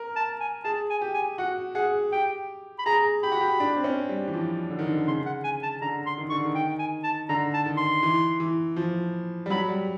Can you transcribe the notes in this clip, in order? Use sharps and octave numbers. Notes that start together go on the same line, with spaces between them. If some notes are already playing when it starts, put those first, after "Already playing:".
Already playing: A#4
A5
G#5
G#4 A5
G#5
G4
G#5
F#4 F#5
G#4 F#5
G4 G5
B5
G#4 A#5
G4 B5
F#4
G4
D4
C4
C#4
G3
E3
F3
D3
D#3
D3
C#3 C6
F#5
G#5
A5
D3 A#5
C6
D#3
D3 C#6
D#3
G5
G#5
A5
D3 A#5
A5
D#3
C6
E3
E3
F3
G3
F#3 B5
G3